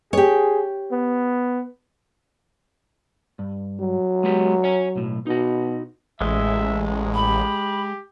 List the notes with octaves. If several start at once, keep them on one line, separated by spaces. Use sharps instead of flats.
G4 G#4 C#5
B3
G2
F#3
G#3 B3 G4
C#5 G#5
B1 A2
B2 D#4 F#4
A1 G#3 E5
G4 B5